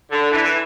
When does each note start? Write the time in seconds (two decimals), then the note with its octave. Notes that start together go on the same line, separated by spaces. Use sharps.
0.11 D3
0.31 E3
0.44 E3